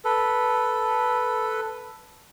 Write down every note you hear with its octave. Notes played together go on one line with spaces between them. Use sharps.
A4 B4